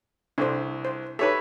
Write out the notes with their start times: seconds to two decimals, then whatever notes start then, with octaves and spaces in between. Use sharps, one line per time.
0.38 C2 D4 A4 C5
0.85 C5
1.19 D#4 G4 A4 B4 C#5 E5